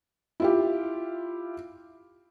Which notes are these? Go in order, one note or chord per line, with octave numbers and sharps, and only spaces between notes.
E4 F4 G4